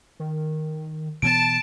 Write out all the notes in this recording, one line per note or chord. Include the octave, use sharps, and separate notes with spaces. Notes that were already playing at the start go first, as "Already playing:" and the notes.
D#3
B2 E3 B3 A5 D7